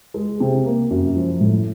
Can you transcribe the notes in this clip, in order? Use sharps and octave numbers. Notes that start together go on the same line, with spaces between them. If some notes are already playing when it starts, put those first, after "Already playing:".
G#3
C3
A#3
F#2
F3
A2